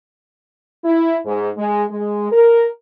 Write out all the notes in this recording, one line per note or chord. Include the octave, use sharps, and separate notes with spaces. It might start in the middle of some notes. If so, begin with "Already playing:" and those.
E4
G#2
G#3
G#3
A#4